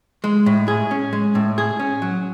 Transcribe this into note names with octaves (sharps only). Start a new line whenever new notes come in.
G#3
A2
G#4
C#4
G#3
A2
G#4
C#4
F#3